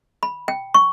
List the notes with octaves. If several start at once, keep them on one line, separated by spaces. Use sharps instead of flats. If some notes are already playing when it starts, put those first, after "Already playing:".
B5
G5
C#6